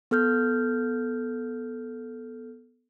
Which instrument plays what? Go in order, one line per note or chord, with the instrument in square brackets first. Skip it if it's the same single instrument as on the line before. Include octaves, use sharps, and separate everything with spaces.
[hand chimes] B3 A4 F6 G6